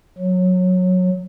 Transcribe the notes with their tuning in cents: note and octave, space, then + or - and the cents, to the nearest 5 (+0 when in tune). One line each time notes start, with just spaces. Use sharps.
F#3 -15